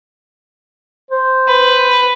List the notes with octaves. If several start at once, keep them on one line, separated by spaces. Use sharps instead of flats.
C5
B4